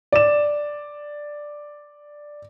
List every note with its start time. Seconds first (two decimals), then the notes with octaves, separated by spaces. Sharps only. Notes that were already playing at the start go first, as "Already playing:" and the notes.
0.12 D5 E7